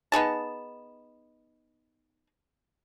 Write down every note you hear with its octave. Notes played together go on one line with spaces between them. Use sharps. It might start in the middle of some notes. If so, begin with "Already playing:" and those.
B3 D#4 G#4 A5